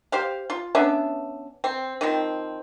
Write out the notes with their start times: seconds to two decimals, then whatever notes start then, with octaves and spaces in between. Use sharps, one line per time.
0.12 G4 C5 F5
0.50 F4
0.75 B3 C#4 D4 E5
1.64 C4
2.01 D#3 F3 C4